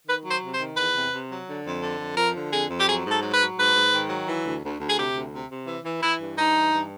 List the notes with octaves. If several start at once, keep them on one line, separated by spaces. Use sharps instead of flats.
D#3 B4
F#3
C5
C3
C5
D#3
E2 B4
C3
C3
F#3
D3
F2
D3
F2
F3 A#4
D3
F2 G#4
F2
G4
F#3 G#4
G#2
A4
F#3
B4
F#3
G#2 B4
G#2
D#3
F#3
E3
D2
D2
D2
G#4
C3 G4
D2
C3
C3
E3
E3
E3 E4
G2
G2 D#4
E3
G2